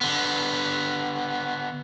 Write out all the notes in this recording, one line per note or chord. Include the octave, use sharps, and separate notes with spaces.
D3 B3